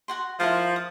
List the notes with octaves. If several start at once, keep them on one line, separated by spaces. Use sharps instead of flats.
F#4 F#5 C6
F3 E4 A#4 C5
D#6